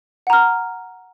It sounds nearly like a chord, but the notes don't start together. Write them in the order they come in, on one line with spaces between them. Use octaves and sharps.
F#5 A#5 F6